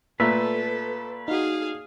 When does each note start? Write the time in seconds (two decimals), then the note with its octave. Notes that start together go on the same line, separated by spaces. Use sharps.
0.20 A#2 A3 A4 B4 E5
1.28 D#4 F#4 G#4 F5